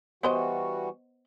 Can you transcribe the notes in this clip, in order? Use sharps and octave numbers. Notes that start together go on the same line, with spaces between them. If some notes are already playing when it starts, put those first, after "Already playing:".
E3 G3 B3 F#4 C5 D#5